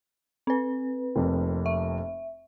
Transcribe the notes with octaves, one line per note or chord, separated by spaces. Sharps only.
C4 B4
F1 F2 A#3
E5